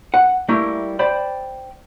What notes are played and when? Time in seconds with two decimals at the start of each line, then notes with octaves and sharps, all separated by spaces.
0.14 F#5
0.49 G3 A3 A#3 E4
0.99 C5 D5 G5 B5